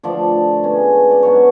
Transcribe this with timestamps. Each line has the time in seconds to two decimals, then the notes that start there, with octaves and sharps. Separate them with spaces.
0.03 D3 F3 A3 D5
0.63 B2 G#3 C#4
1.11 D5
1.23 G#2 F#3 B3 D4 C#5